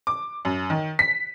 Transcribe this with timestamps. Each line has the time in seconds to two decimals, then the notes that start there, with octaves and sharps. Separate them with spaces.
0.07 D6
0.45 F#2
0.70 D#3
0.99 B6